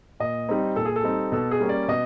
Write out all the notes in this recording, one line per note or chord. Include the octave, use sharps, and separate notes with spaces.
A#2 D#5
G3 C4 D#4
A#2 A4
G#4
A4
G3 C4 D#4
B2 A4
G#4
G3 A#3 C#4
D5
B2 D#5